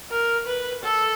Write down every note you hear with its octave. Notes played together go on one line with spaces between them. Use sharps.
A#4
B4
A4